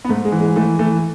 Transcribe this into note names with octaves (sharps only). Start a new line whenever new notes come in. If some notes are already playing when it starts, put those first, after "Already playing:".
B3
G#2 A3
G#3
E3
G#3
E3 A3
E3 A3